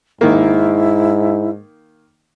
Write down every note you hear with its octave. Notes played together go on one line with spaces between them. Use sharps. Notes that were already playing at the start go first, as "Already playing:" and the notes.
G#2 D#3 A#3 E4